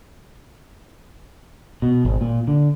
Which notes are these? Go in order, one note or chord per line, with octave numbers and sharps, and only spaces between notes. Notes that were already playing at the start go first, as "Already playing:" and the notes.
B2
G#1
A#2
D3